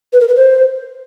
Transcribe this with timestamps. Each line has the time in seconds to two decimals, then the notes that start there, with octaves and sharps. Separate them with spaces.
0.13 B4
0.20 A#4
0.28 B4
0.36 C5